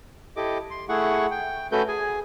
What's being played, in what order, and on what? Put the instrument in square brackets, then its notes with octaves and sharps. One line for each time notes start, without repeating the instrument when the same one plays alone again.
[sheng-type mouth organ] E4 G4 A4 D#5 D6
C6
A3 E4 G#4 F#5 C#6
G5
A3 C#4 F#4 A4 B4 G6
G#4 G#5